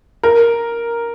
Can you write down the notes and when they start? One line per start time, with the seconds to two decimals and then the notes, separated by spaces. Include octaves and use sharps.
0.23 A#4